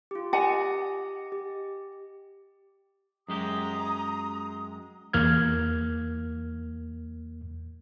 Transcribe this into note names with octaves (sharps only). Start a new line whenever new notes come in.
F4 G4
G4 D#5 F#5 G#5
G4
F#2 G#3 G4 A#5 D#6
E2 A#3 F6 G#6